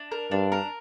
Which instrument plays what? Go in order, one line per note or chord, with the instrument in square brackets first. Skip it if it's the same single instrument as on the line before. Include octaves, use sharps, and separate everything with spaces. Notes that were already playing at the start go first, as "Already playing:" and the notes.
Already playing: [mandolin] D4
A#4
[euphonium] G2 [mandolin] D4
[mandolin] A#4